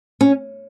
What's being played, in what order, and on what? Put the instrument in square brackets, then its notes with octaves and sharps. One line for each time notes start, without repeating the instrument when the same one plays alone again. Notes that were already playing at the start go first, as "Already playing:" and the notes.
[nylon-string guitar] C#4